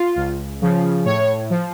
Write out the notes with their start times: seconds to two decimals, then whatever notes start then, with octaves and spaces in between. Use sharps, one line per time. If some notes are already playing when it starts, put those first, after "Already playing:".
Already playing: F4
0.16 C#2
0.61 C#3 F3
1.05 A2 C#5
1.50 F3